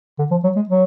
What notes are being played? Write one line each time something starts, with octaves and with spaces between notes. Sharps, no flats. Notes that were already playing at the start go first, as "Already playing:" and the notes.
D3
F3
F#3
G#3
F#3